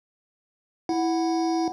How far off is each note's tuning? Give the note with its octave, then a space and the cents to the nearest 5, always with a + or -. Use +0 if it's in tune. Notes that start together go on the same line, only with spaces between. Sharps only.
E4 +0 F#5 +0